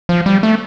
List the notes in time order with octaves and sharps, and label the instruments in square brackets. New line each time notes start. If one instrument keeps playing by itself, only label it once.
[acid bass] F3
G3
A3